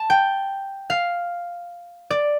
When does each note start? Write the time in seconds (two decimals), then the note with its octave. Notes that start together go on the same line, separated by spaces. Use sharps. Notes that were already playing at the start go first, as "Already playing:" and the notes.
Already playing: A5
0.10 G5
0.90 F5
2.10 D5